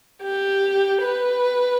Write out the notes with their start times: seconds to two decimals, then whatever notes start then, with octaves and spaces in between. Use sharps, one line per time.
0.23 G4
1.02 B4